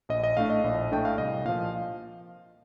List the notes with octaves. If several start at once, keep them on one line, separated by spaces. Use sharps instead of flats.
A#1 D#5
D#5
A2 A3 D4 F5
D#5
A#1
A2 A3 D4 G5
F5
C2 D#5
A#2 F3 F5